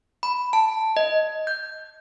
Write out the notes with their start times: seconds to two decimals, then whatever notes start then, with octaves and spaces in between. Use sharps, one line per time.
0.23 B5
0.53 A5
0.97 D#5
1.47 G6